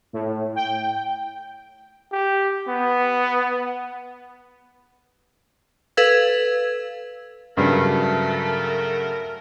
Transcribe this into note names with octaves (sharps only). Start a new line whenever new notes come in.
A2
G5
G4
B3
A4 B4 F5 E6 G#6
G2 C#3 F#3 A3 A#4